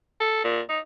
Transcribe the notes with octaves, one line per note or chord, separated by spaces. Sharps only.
A4
A#2
D#4